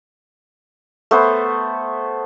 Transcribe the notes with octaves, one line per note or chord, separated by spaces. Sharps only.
A3 B3 C5